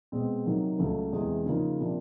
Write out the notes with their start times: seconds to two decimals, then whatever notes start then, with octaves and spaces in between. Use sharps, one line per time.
0.12 B2 G#3 C4
0.46 C3 D#3 F#3
0.79 C#2 C#3 F#3 A3 C#4
1.13 E2 C3 E3 G#3
1.46 C#3 F3 A#3 D#4
1.80 C3 F3 A#3 D4